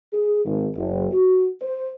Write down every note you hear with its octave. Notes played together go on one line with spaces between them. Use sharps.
G#4
G#1
F#1
F#4
C5